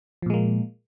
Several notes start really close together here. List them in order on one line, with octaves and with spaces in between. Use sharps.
F3 A#2 G#3 A#3